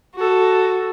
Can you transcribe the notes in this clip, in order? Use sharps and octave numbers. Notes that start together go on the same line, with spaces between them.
F#4 A4